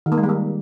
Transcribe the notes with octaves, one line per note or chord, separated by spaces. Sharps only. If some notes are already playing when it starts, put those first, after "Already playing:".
D#3
A#3
G#3
G3
A#3